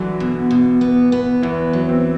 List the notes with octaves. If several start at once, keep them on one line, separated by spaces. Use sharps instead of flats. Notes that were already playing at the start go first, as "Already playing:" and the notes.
Already playing: D3 E3 F#3
B2
B2
B3
B3
E2 E3
F#3
C4